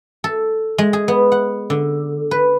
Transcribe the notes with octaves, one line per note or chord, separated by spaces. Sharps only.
A4
G#3
G#4
B3
F#5
D3
B4